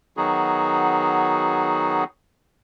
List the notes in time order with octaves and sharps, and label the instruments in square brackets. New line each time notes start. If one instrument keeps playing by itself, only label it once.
[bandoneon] D#3 F#3 B3 D#4 F#4 G#4